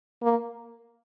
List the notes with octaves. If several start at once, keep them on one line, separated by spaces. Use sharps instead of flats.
A#3